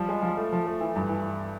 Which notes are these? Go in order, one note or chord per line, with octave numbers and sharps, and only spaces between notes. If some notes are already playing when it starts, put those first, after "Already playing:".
Already playing: F3 G3
G#3
F3
A3
F3
A3
E3
G2
E3